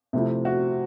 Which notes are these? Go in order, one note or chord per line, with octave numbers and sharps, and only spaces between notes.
C3 F3 A3 C4 E4
F#4